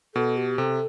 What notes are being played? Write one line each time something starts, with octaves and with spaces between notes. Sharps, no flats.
B2 A4
G4
C3 A4